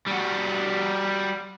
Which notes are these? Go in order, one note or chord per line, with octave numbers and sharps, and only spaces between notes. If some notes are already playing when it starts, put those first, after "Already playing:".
G3 F#4